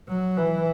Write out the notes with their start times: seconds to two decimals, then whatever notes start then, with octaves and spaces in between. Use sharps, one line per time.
0.08 F#3
0.37 E3